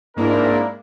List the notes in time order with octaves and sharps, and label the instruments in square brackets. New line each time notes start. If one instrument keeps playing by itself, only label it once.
[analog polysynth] G#2 A#3 E4 [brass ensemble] C4 D4 A#4